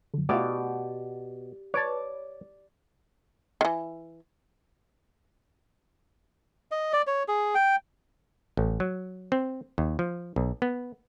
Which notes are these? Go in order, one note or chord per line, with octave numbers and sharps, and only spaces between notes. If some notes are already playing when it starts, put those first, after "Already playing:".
F#2 D3
B2 A3 E4 F4 G4 D5
B4 C#5 D5 A5 D6
D#3 E3
D#5
D5
C#5
G#4
G5
A1
F#3
C4
D#2
F3
B1
B3